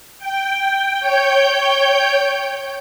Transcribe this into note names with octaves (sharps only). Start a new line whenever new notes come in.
G5
C#5 G5 G6